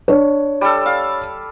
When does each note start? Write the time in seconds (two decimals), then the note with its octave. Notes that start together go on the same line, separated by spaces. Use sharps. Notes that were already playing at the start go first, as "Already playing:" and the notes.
0.08 D4 C#5
0.61 G3 A4
0.86 F5